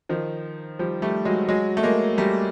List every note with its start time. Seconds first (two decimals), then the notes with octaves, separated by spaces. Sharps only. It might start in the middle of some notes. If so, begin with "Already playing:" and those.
0.09 D#3 F3
0.79 F3 G3
1.02 G3 A3
1.25 F#3 G#3
1.49 F#3 G#3
1.77 A3
1.83 G#3 A#3
2.18 G3 A3